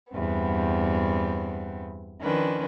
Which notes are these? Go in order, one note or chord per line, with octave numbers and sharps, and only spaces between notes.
E2 G2 B3 C4
D#3 F3 C#4 D4 B4